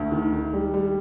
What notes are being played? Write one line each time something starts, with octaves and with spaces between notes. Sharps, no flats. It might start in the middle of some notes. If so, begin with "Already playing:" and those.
Already playing: D2
D#3
D#3
G3
G3